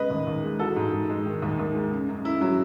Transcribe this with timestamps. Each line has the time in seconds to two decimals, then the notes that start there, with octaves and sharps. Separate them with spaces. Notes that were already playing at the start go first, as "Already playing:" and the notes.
Already playing: C#3 G#3 B4 D#5
0.10 D#2
0.27 D#2
0.44 G#3
0.59 E3 F#4 A4
0.76 G#2
0.92 G#2
1.09 G#3
1.25 D#3
1.42 D#2
1.59 D#2
1.75 G#3
1.92 C#3
2.08 F#2
2.25 F#2 E4
2.41 F#3